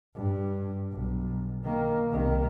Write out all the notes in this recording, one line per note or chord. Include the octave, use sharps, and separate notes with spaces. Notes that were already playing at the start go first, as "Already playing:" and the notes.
G2
B1
D#3 A#3
C2 D#3